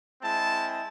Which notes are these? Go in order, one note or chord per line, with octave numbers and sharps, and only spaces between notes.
G#3 C4 E4 A5